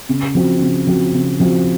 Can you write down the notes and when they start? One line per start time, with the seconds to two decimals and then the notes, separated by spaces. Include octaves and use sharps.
0.09 C#3
0.35 F3 C4 F#4
0.61 C#3
0.87 F3 C4 F#4
1.14 C#3
1.40 F3 C4 F#4